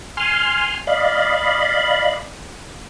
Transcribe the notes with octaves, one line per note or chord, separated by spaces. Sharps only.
G#5 C6 F6
D5 D#5 F5 B5